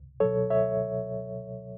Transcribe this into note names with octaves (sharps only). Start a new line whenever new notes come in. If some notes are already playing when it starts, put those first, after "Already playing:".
Already playing: C#2
B2 F#3 A4 C#5
C#2 C#5 E5